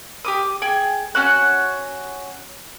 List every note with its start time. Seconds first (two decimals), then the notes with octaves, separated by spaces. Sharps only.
0.25 G4 D6 D#6
0.62 G#4 G5 G#5
1.15 C#4 F#4 F#6